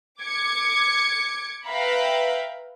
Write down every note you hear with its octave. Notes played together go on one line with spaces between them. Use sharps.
D6 G#6 C#7
B4 E5 F5 G5 A#5 B5